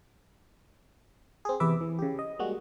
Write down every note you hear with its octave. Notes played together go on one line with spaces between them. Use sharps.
C4 G#4
E2 C3 B4 E5 D6
E3
C#3 G4
D#5
G3 G#3 A#3 F#4